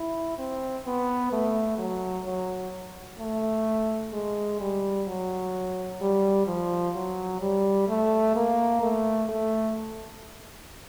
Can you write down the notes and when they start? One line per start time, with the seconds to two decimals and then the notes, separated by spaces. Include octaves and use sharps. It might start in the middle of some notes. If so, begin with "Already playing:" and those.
Already playing: E4
0.38 C4
0.86 B3
1.32 A3
1.79 F#3
2.26 F#3
3.19 A3
4.13 G#3
4.60 G3
5.07 F#3
6.01 G3
6.47 F3
6.95 F#3
7.42 G3
7.89 A3
8.35 A#3
8.82 A3
9.29 A3